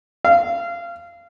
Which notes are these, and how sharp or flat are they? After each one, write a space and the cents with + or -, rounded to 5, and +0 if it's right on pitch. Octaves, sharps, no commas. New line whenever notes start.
F5 -25